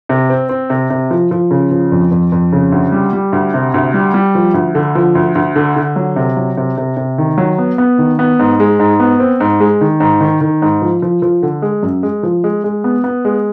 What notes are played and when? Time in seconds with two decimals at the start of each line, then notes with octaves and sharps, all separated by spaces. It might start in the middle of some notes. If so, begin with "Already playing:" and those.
0.09 C3
0.30 C4
0.49 C4
0.70 C3
0.90 C3
1.11 F3
1.31 F3
1.51 C#3
1.71 F3
1.92 F2
2.11 F2
2.32 F2
2.53 C#3
2.72 D2
2.92 G3
3.13 G3
3.33 D2
3.54 C3
3.74 D2
3.94 G3
4.14 G3
4.35 F3
4.54 D2
4.75 D3
4.95 F3
5.15 D2
5.35 D2
5.56 D3
5.76 D3
5.96 F#3
6.16 C3
6.37 F#3
6.57 C3
6.77 C3
6.97 C3
7.18 D#3
7.38 F#3
7.58 B3
7.78 B3
7.98 D#3
8.19 B3
8.39 G#2
8.60 G#3
8.79 G#2
9.00 B3
9.20 C4
9.40 G#2
9.60 G#3
9.81 D#3
10.00 G#2
10.21 D#3
10.41 D#3
10.62 G#2
10.82 F3
11.02 F3
11.22 F3
11.43 D3
11.62 G#3
11.83 F#2
12.03 G#3
12.23 F3
12.44 G#3
12.64 G#3
12.84 B3
13.04 B3
13.25 G#3